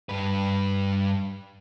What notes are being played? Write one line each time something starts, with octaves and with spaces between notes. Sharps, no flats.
G2 B4